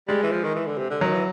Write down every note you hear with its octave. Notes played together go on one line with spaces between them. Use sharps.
G3 G#3
E3
F3
D#3
E3
D3
C3
D3
D#3 F#3
E3